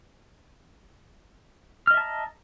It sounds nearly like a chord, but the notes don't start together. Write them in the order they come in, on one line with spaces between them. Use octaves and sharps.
F6 D#5 E5 A5 A#5